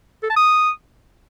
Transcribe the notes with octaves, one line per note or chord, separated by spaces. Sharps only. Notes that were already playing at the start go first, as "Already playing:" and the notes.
A4
A5
D#6